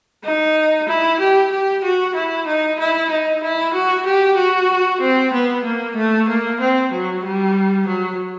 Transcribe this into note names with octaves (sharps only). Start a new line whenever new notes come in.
D#4
E4
G4
G4
F#4
E4
D#4
E4
D#4
E4
F#4
G4
F#4
C4
B3
A#3
A3
A#3
C4
F#3
G3
F#3